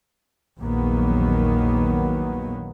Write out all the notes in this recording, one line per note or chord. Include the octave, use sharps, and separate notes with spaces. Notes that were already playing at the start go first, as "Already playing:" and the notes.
A#1 E2 D#3 F#3 A#3 B3